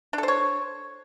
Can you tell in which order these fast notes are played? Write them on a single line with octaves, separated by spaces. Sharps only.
D4 A4 C5 C#5